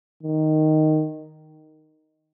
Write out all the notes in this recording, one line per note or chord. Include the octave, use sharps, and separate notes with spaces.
D#3